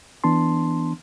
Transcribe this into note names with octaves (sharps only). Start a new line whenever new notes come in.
E3 B3 D4 A5 C6